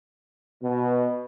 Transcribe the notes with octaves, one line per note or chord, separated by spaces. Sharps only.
B2